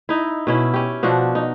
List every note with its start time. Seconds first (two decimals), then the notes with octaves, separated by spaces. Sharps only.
0.09 D#4 E4
0.47 B2 C#4 E4
0.74 C#4 G4
1.03 B2 F3 D4 F#4
1.35 D#4